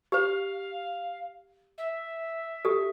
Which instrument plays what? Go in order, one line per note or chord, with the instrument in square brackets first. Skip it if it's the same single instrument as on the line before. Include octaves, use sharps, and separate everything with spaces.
[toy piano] G4 C5 [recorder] F5
[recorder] E5
[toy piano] G4 A4